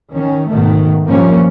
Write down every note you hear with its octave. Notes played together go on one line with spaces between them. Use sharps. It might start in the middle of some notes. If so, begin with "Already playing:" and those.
D#3 C#4
G#2 B2 D#3 A3
G2 A#2 F3 A#3 C#4